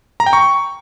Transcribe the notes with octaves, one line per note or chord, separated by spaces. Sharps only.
A#5
G5
C#6